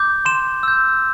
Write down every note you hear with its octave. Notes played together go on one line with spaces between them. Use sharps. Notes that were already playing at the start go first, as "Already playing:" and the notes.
Already playing: D6 G6
C6 E7
E6 G6